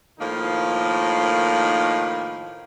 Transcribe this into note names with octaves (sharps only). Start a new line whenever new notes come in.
A2 D#3 F3 A#3 D#4